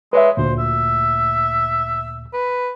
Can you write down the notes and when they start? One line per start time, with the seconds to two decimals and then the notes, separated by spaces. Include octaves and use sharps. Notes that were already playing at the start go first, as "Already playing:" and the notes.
0.13 G#3 B4 C#5 E5
0.37 D2 A#2 C5
0.59 E5
2.33 B4